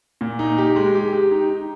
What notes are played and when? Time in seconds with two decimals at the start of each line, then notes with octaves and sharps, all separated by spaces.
0.21 A#2
0.39 D#4
0.58 G4
0.76 G#3
0.95 G4
1.13 G4
1.31 D#4
1.50 D#4